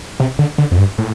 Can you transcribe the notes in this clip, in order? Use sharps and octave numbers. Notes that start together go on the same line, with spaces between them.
C3
D3
D3
F2
G2
A2